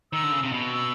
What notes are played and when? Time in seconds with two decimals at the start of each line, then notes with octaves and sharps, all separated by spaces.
0.12 D#3 E6
0.23 D3
0.32 C#3
0.43 C3
0.52 B2
0.73 E6